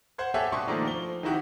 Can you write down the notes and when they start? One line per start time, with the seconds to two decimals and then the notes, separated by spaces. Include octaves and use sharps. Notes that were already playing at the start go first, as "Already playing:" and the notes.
0.18 C5 F#5 C6 G#6
0.34 G4 A4 C#5 E5 F#5 G#5
0.52 B2 D4 F#4 C6 C#6
0.67 D#3 F3 A3 A#3 D4 D#4
0.85 F3 G7
1.23 D#3 C4 D#4 E4 F#4 G4